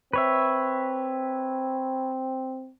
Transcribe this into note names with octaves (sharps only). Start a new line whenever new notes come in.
C4 B4 C#5 E5